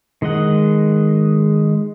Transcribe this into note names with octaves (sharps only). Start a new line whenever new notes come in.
D#3 G#3 D#5 F#5